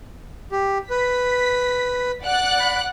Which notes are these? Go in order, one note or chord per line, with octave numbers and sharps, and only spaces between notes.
G4
B4 B6
D5 F#5 F#6
B5